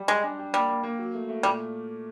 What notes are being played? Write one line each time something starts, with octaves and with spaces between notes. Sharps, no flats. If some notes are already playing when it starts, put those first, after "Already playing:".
Already playing: G3
G#3 G4
D4
G4
G3 A#3
A#3
A#3
F#3
A3
A3
A#2 G3